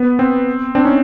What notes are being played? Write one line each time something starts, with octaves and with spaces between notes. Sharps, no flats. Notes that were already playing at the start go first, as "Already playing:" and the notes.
Already playing: B3
C4
C4 D4
C#4 D#4